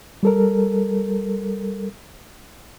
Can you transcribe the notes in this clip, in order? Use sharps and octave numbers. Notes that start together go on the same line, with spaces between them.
G3 A4 A#4